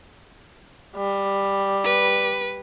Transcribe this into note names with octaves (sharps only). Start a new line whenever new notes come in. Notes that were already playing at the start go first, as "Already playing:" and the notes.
G3
B4